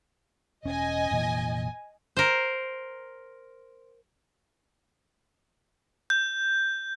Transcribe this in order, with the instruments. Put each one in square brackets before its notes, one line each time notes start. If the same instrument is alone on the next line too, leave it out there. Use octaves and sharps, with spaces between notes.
[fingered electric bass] E1 C#4 [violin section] D#5 G#5
[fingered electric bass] F1 A#2 E3
[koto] A#4 C5
[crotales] G6